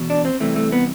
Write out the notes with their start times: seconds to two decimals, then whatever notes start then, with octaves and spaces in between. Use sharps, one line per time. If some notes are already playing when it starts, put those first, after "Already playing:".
Already playing: E2 B2
0.10 D4
0.25 C4
0.40 C2 C3 E3 A3
0.56 A3
0.72 B3